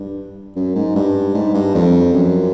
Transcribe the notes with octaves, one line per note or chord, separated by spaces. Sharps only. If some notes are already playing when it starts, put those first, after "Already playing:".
Already playing: G2
F#2
G#2
G2
G#2
G2
F2
F#2